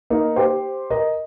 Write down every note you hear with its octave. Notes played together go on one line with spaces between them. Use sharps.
A#3 D#4
G4 C5
A#4 D#5